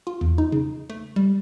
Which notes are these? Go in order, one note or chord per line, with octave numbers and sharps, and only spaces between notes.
F4
E2
D#4
C#3
A3
G3